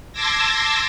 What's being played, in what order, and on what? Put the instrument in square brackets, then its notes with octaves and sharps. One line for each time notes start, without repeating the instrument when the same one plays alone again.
[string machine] A5 C6 D6 E6 G#6 A#6